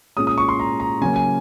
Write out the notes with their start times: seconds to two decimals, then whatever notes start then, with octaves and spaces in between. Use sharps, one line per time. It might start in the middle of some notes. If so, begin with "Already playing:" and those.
0.17 A#2 G#3 C#4 D#6
0.27 D#6
0.38 C#6
0.49 C6
0.60 A#5
0.80 A#5
1.01 C#3 F#3 A#3 C#4 G#5
1.16 G#5